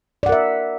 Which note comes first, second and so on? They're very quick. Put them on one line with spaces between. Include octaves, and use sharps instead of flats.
D5 F#5 A#4 E5